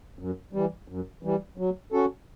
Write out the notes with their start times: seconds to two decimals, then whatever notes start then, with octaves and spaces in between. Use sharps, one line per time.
0.19 F#2
0.53 E3 G3
0.88 F#2
1.23 E3 G3
1.58 F#3
1.92 C#4 F#4 A4